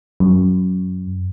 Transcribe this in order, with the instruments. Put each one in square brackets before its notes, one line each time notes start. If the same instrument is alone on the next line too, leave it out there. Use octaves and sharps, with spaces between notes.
[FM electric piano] F#2